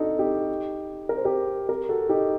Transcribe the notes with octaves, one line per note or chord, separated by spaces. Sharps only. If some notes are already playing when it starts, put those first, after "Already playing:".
Already playing: D4 D#4 F#4 A4
D#4 G4
A#4
C5
G4 A#4
G4 A#4
F#4 A4
D#4 G4